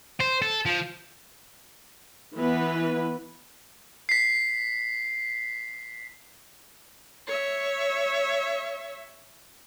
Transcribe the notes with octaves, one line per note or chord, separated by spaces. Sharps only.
C5
A4
F3
E3 B3 B4
B6 C7
C#5 E5